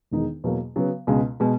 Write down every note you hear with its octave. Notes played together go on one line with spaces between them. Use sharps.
E1 E2 D#3 G#3 D#4
E2 B2 F#3 A#3
C#3 F#3 B3
C#2 B2 G#3
B2 G#3